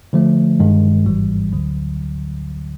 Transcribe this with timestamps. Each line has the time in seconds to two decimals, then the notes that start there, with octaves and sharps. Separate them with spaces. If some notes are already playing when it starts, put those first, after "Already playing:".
0.13 D3 F3 A3
0.60 G2 D#3 G#3
1.06 G#1 G#2 E3 G3
1.53 D2 D3 F#3